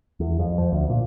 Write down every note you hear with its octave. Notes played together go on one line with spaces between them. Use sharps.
E2
F2
F3
D2
A#2